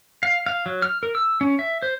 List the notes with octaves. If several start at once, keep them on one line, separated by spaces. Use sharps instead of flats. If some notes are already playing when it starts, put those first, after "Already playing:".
F5
F5
F#3
F6
A#4
E6
C#4
E5
C5